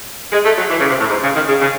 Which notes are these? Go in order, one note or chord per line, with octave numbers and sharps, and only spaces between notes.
G#3
A3
F#3
E3
C#3
C3
A2
G#2
C#3
D#3
C#3
C#3